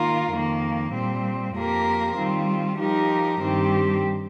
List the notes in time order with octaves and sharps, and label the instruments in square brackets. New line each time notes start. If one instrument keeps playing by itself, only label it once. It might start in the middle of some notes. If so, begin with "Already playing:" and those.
Already playing: [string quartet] D#3 A#3 F4 A#4
F2 D#3 A#3
A#2 G3 C4
F2 F3 A#3 G4 A#4
D#3 G3 C4 F4
F3 D#4 G4 A#4
G2 D#3 C4 G4